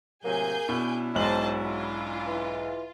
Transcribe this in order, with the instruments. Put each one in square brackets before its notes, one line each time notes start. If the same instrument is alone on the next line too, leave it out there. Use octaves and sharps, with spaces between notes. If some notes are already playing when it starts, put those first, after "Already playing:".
[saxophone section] A2 C3 F#3 [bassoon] A#3 [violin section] G#4 G#5 G6
[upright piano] B2 [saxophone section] C#4 D4 E4
[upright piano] B1 G#2 F#7 [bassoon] F#3 [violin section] C5 D#5 A5
[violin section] F4
[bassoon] E3